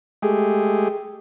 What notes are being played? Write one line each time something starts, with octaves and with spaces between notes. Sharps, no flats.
G#3 A3 G4 G#4